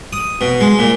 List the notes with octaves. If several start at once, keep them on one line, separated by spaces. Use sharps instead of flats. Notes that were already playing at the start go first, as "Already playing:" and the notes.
D#6
B2
G#3
A#2